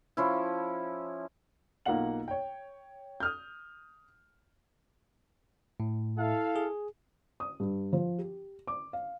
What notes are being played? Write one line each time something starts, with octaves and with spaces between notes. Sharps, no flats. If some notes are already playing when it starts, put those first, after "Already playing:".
F3 C#4 E4
B1 A#3 F4 F5 F#5 F#7
C#5 G5
D#6 F6 G6
A2
E4 A4 F5
G#4
D#6
G2
F3
G4
D6
F5